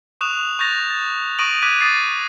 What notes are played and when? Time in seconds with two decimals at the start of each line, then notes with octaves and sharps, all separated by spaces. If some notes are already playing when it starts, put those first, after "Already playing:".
0.21 C#6 D#6 F#6 E7 F7
0.59 C#6 F#6 G6 A6 A#6 F7
0.90 A6
1.39 C#6 D#6 A#6 D7 D#7 F#7
1.62 D6 F#6 G#6 B6 D#7
1.81 D6 D#6 A6 C7